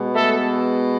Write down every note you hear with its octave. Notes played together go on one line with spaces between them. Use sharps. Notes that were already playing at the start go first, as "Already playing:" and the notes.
Already playing: B2 G#3 B3
A3 A4